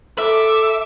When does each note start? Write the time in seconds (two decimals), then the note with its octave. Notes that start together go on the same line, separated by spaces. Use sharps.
0.18 A4 E5 D6